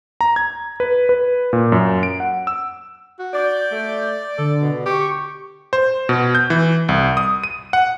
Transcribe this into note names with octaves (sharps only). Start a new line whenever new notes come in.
A#5
G#6
B4
B4
A#2
F#2
D7
F#5
E6
F#4
D5 G6
A3
D3 A4
B2
G4 C#6
C5
B2
G6
E3
C2
D#6
D#7
F#5